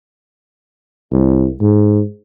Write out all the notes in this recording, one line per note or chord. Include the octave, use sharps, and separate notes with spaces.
C2
G#2